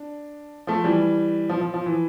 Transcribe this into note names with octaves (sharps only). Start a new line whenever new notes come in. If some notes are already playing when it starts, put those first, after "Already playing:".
Already playing: D4
F3 A3
E3 G3
F3
F3
F3
E3